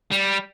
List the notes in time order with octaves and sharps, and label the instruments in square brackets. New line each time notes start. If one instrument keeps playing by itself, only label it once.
[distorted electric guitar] G3